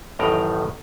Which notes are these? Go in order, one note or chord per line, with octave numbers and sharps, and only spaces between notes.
A1 F#2 A2 D#3 G5 A#5